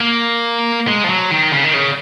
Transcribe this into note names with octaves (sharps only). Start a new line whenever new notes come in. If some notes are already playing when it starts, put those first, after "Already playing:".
A#3
G#3
F3
F#3
D#3
C#3
D#3
C#3